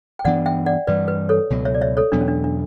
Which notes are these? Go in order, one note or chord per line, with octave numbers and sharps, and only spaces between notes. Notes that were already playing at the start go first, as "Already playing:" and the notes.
G5
G2 E3 B3 D4 D5 F#5
E5 G5
D5 F#5
G2 E3 G3 B4 D5
B4
A4 C#5
C#2 B2 F#3
C#5 E5
D5
C#5 E5
A4 C#5
E2 B2 F#3 B3 D4
C#4
D4
D4